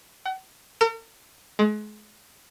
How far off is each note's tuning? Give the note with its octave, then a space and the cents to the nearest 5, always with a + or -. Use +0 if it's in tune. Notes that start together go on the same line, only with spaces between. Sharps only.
F#5 +40
A#4 -45
G#3 +35